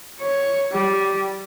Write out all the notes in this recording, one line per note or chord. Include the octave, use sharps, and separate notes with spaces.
C#5
G3